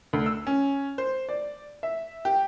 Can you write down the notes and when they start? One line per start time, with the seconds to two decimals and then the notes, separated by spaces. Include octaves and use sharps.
0.13 D2
0.26 E6
0.47 C#4
0.98 C5
1.29 D5
1.83 E5
2.25 G4